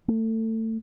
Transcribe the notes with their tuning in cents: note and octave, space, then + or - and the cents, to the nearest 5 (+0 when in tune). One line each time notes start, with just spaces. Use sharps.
A3 +25